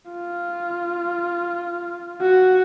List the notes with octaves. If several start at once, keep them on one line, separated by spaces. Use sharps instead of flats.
F4
F#4